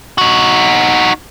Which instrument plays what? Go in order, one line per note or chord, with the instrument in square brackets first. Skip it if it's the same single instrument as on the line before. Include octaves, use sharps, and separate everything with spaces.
[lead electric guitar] D#4 F#4